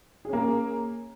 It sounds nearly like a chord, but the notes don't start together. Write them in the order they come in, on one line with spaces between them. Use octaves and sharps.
G#4 C#4 A#3